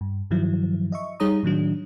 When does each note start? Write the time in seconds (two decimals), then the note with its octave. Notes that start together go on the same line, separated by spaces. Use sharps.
0.01 G2
0.31 G2 D#3 F3 F#3 E4
0.92 D#5 E5 C#6
1.20 G3 D#4 G#4 C#5 A#5 D#6
1.43 A2 D#3 F#3 D4